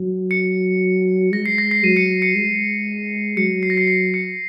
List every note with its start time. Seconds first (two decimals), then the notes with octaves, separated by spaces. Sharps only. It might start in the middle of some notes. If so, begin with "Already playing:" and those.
Already playing: F#3
0.31 C#7
1.33 G#3 A#6
1.46 C7
1.58 A#6
1.71 C7
1.83 F#3 D#7
1.96 C#7
2.22 C#7
2.35 G#3
3.37 F#3 C#7
3.63 C7
3.70 A#6
3.78 C7
3.88 C7
4.14 C#7